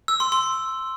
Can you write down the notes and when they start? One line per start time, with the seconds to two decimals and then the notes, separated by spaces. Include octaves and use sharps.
0.08 E6
0.20 C6
0.32 C6